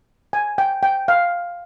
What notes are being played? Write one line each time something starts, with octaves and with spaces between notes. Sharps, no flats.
G#5
G5
G5
F5